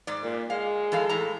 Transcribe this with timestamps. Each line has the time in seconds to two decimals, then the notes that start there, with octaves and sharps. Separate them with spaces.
0.07 G#2 D5
0.23 A#2
0.50 G#3 F5
0.92 E3 A4 F5
1.09 A2 A4 A#5